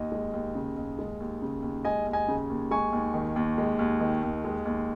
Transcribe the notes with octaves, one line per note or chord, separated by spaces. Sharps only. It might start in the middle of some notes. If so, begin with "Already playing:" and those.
Already playing: D#2 D#5
G#3
D#2
C#3
D#2
G#3
D#2
C#3
D#2
G#3 D#5 G#5
D#2
D#5 G#5
C#3
D#2
G#3 G#5 C#6
D#2
D#3
D#2
G#3
D#2
D#3
D#2
G#3
D#2